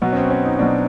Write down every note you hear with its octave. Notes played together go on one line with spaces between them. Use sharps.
B2 F#3 B3
C#4
C4
C#4
D#4
B2 F#3 D4